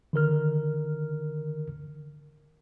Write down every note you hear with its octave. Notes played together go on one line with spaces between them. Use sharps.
D3 D#3 A#4 F6